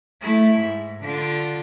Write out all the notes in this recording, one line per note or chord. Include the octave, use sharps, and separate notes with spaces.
A3 E4
G#2
D3 F4